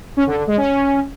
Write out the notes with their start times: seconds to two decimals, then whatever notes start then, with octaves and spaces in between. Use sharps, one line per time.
0.17 C#4
0.27 D3
0.37 D3
0.47 G#3
0.57 C#4